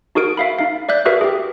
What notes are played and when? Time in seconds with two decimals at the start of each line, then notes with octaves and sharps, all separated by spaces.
0.15 D#4 F#4 G#4 A#4 D7
0.37 E5 F5 B5
0.59 D#4 F5
0.89 D5 E5 F#6 G6
1.05 F#4 G#4 A#4 B4 E5
1.21 G4 G#4